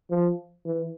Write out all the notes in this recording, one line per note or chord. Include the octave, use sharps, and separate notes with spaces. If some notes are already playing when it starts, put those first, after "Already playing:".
F3
E3